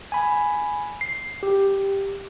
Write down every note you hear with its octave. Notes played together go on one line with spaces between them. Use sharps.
G#5 B5
C7
G4